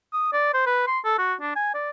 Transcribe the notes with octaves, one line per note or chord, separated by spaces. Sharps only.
D#6
D5
C5
B4
C6
A4
F#4
D4
G#5
D5